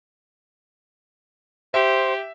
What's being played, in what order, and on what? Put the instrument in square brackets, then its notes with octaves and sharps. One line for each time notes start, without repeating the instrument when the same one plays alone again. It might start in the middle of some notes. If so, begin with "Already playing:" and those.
[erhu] G4 [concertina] C5 [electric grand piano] E5